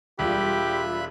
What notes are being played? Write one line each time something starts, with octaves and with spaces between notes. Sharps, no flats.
E1 G3 F4 G4 E5 B5 F#6